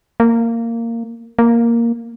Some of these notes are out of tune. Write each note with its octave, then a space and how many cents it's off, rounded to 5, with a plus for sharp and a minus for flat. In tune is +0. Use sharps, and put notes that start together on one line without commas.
A#3 -15
A#3 +0